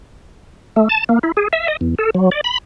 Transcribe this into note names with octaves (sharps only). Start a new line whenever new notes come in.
A3
A5
A#3
E4
G#4
E5
D#5
E2
A4
F#3
D5
B5